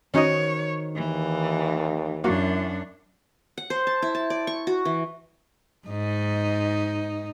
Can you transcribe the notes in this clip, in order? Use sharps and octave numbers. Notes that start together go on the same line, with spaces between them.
D#3 C#4 D#4 F#4 C5 C#5 D#5
D#2 E3
F#2 A#3 D4 E4 F#4
F#5
C5
A5
E4
A5
D5
C#6
F#4
E3
G#2 D#4